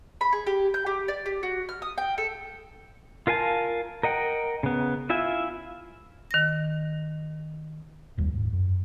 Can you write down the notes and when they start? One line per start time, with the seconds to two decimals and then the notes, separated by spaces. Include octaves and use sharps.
0.21 B5
0.33 G#4
0.47 G4
0.74 G6
0.86 G4
1.08 D5
1.26 G4
1.43 F#4
1.69 F6
1.82 D#6
1.98 G5
2.18 A4
3.27 F4 A#4 F5 G#5 A5
4.03 A#4 D#5 F#5 G5
4.63 C#3 B3
5.10 E4 F4 E5 G#5
6.31 D#3 A#6
8.17 F1 D#2 B2 G3
8.33 D#1 G#2
8.53 F#2